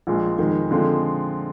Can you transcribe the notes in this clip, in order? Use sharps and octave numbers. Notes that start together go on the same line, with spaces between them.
A#1 A#2 G#3
F2 D#3 G#3
D3 F3 G#3 C4